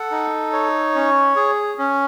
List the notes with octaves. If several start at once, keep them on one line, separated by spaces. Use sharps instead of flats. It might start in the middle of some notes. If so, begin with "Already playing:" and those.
Already playing: A4 F#5
D#4
C#5
C#4
G#4
C#4